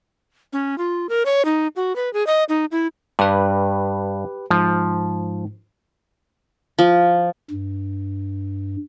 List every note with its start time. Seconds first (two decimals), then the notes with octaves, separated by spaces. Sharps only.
0.53 C#4
0.78 F4
1.09 A#4
1.26 C#5
1.45 D#4
1.76 F#4
1.96 B4
2.13 G#4
2.27 D#5
2.49 D#4
2.72 E4
3.19 G2 G4 B4
4.51 G#2 F3
6.79 F3
7.51 G2